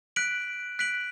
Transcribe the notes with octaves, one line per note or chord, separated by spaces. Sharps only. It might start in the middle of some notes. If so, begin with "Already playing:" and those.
F#6 B6 D7 F#7
F#6 B6 D7 F#7